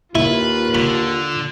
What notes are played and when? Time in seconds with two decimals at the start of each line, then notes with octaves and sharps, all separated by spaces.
0.15 D#2 E4 F4 B4
0.75 D3 B5